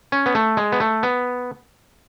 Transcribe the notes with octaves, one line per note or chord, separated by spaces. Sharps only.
C#4
B3
A3
G#3
B3
A3
B3